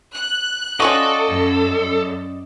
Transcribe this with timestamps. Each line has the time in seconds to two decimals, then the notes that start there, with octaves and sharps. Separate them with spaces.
0.13 F#6
0.80 C#4 F4 F#4 A4 D5 D#5
1.29 F#2